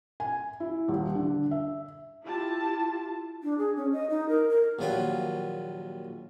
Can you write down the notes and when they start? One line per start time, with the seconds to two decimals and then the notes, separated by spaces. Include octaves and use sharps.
0.20 G#5
0.60 E4
0.88 D#1
1.15 D3
1.51 E5
2.25 E4 F4 G4 A5
3.43 D4
3.58 G#4
3.77 C#4
3.93 D#5
4.10 D#4
4.29 A#4
4.50 A#4
4.79 A#1 D#2 F#3 F4 B4 G5